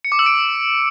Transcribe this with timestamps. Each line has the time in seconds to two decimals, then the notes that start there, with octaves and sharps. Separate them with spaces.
0.04 C#7
0.12 D6
0.19 E6
0.26 D7